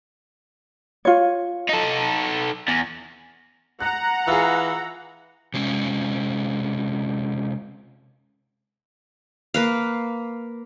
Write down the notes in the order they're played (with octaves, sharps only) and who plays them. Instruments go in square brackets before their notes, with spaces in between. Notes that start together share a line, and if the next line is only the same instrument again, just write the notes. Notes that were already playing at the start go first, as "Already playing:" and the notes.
[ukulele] F4 C#5
[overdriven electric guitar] D#4 A4
E2
[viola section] F#5 A#5 [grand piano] F#6
[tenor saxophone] E3 [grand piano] F4 G#4
[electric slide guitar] C3 G#3 C#4
[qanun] A#3 B4 F5